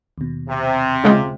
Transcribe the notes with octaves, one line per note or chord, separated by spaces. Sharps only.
D#2 B2
C3
C#3 G#3 F4